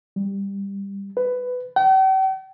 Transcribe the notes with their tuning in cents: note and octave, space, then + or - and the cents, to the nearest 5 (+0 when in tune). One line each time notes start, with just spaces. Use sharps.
G3 +15
B4 +15
G5 -45